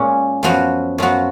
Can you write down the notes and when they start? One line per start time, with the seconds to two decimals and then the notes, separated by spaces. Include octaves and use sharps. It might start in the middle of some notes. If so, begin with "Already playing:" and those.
Already playing: A#2 G#3 C#4
0.43 F#2 F3 B3 F#4
0.98 F#2 F3 B3 F#4